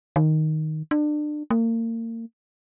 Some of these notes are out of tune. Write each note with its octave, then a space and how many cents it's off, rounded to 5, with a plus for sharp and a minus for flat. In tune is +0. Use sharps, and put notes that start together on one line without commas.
D#3 +0
D4 +30
A#3 -35